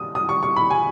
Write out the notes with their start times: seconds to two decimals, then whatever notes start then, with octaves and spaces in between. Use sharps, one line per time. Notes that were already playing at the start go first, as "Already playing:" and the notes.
Already playing: D#6
0.15 D#6
0.29 C#6
0.43 C#6
0.56 B5
0.70 G#5